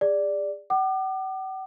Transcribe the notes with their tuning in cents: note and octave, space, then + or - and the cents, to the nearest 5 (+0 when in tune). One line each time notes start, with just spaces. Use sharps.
G#4 -30 D5 +0
F#5 +45 D6 +35